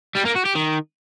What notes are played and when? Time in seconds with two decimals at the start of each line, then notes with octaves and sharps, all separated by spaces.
0.16 G3
0.26 A#3
0.36 F#4
0.46 G4
0.56 D#3